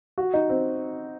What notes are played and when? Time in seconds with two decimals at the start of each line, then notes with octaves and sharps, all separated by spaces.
0.18 F#4
0.34 D#4
0.49 C4